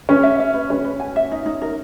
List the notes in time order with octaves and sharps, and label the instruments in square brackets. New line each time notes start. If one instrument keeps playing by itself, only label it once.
[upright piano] C#4 [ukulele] B4
[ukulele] E5
E5
B4
[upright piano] C#4 [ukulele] B4
[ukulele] B4
G#5
E5
D#4
D#4
A#4